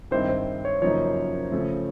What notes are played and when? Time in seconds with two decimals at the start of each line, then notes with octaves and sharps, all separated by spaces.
0.11 G2 D#3 G#3 C4 E4 C5
0.29 C5
0.65 C#5
0.82 F#2 C#3 F3 A#3 D#4 C#5
1.52 C#3 F3 A3